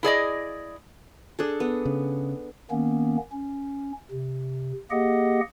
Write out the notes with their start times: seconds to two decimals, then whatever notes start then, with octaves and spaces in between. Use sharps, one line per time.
0.03 E4 G#4 D5 D#5
1.39 D4 G#4 A4
1.60 B3
1.85 C#3
2.71 D#3 A#3 B3 C#4
3.32 C#4
4.11 C3
4.91 A#3 G4 G#4 D#5 F#5